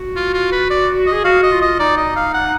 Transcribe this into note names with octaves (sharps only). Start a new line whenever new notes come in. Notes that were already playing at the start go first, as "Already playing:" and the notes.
Already playing: F#4
F4
F4
B4
D5
D#5
G#4
F#4 F5
D#5
F4
D#5
D#4 D5
D#5
F5
F#5